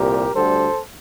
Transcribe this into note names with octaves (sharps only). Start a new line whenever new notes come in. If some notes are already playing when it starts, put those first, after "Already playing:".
Already playing: C2 A#2 G4 A#4
D2 D3 G3 A4 C5